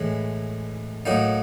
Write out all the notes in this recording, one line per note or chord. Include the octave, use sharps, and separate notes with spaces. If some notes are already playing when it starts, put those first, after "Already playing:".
Already playing: A2 E3 G#3
A2 F#3 A#3 D#4